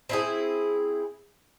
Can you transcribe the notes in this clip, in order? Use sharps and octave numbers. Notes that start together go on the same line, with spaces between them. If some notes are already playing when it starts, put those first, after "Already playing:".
C4 E4 G#4